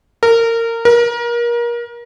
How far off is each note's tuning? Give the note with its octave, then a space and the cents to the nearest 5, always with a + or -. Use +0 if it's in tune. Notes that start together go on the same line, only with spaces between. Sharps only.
A#4 -20
A#4 +30